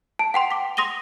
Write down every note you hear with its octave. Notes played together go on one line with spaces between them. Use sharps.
A5
F#5 G5 C6
D6 B6
C6 D#6 A#6 D#7 G7